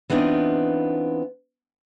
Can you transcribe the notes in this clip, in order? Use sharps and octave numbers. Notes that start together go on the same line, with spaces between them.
E3 B3 C4 D4 D#4 F4